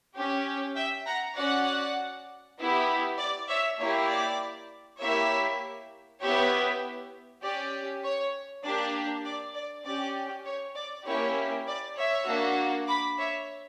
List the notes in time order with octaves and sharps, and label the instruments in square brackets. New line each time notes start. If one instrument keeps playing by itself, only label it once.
[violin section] C#4 G4
E5 G5
F#5 A#5
C#4 F#4 D5 F#5
B3 E4 G4
D5
C#5 E5
A#3 E4 G4 C#5
D5
A#3 E4 G4 C#5 E5
B3 E4 G4 C#5 E5
C#4 G4 D5
C#5
A#3 D4 G4 D5
D5
D5
C#4 G4 D5
C#5
D5
A#3 C#4 E4 G4 C#5
D5
C#5 E5
A#3 D4 F#4
B5 D6
C#5 E5